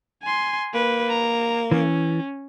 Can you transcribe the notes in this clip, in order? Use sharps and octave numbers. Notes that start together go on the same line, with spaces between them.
G#5 C6
A#3 B4
A#5
E3 C#4